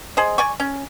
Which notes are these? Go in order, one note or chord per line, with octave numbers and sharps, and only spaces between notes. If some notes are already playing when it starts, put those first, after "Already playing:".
G#4 C5 D#5
D5 G#5 C#6
C#4